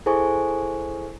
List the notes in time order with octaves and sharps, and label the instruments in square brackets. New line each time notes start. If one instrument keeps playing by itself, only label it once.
[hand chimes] E4 G#4 A4 C5 G#5 C#6